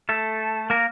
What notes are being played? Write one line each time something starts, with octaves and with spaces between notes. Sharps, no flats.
A3 A4
A#3 A#4